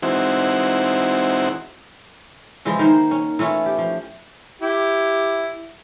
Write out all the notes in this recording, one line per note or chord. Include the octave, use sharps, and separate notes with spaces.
E3 G#3 C4 D#4 E4 F#4
C#3 E3 F3 G#3
D#3 A#3 C5
C#4
E3 A3 C#4 F4
G4
F3
E4 G4